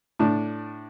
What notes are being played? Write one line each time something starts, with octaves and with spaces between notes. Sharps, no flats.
A2 D4